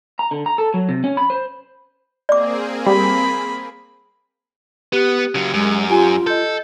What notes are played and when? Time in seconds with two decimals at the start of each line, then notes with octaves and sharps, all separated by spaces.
0.19 A#5
0.31 D3
0.46 A#5
0.58 A4
0.74 F#3
0.89 C3
1.04 C#4
1.17 B5
1.30 C5
2.29 A#3 C4 G#4 D5 D6
2.86 G3 B5
4.93 B3 G4 F#6
5.35 C#3 F#3
5.54 F#2 G#3
5.90 F4 G4 G#5
6.27 A4 D#5 G6